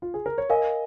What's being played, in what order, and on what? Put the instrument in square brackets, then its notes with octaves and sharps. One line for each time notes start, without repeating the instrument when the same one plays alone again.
[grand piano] F4
G#4
A#4
C#5
[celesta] A#4 F5 G#5 [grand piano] D#5